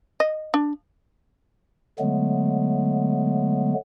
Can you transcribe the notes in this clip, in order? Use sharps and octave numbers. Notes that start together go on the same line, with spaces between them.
D#5
D4
D3 F#3 G#3 A3 B3